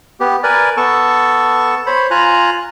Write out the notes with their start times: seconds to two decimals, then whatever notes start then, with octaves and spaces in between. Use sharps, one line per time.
0.20 B3 G4
0.43 A#4 B4 D5 G#5
0.77 B3 A4 A5 C#6
1.86 C5 C#5 B5
2.11 F4 G#5 A#5 F#6